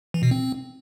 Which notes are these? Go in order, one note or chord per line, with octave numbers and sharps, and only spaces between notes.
E3
B2
C4